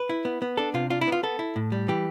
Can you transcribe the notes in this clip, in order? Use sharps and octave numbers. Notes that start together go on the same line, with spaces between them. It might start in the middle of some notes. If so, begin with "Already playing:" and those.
Already playing: B4
E4
B3
B3
D4 A4
C3 F4
D4 F4
E4
B3 F4
B3 A4
E4
A2
G3
E3 G4